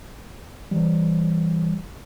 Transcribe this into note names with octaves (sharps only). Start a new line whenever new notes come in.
E3 G3